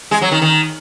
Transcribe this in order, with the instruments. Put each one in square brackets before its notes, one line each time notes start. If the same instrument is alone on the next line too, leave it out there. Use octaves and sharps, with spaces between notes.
[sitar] G#3
F#3
D#3
D#3